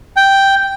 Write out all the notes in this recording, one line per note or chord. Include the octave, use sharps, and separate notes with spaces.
G5